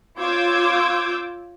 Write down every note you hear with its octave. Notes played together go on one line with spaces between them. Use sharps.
F4 C#5 D6 E6 G6 G#6